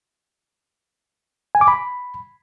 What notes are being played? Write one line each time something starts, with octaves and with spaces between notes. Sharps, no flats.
G#5
D6
B5